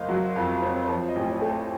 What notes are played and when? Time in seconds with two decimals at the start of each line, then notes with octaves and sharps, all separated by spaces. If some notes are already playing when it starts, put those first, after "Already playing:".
Already playing: F#1 A#4 C5 D#5 F5
0.09 F#3 F#5
0.36 F2 F5
0.62 C4 C#5
0.83 C5
0.88 F3 C#5
1.08 D#5
1.15 A1
1.29 C#5
1.41 A3
1.48 C5